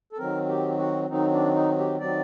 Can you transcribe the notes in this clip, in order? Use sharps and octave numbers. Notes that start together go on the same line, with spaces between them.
A4
D#3 F#3 C4 A#4
G4
F#4
D#3 F#3 C4 D#4
D4
D#4
G4
D#3 F#3 C4 D5